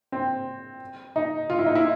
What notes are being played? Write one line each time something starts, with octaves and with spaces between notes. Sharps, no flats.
C4
D#4
F4
E4
D#4
E4